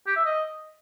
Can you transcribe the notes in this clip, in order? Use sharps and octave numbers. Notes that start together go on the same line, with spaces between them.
G4
E5
D#5